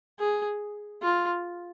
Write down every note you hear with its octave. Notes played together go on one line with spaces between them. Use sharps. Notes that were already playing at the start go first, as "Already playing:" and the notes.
G#4
F4